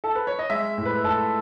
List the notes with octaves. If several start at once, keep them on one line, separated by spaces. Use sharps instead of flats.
A4
B4
C#5
D#5
G#3 E5
A2
B4
A2 A4